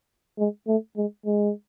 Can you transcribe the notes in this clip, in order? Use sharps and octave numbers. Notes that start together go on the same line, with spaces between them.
G#3
A3
G#3
G#3